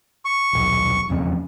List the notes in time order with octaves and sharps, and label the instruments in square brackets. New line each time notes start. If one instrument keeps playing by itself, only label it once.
[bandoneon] C#6
[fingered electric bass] D#1 B1
E1 F2 C#3